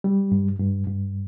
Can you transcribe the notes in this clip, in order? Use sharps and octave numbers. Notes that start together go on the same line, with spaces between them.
G3
G2
G2
G2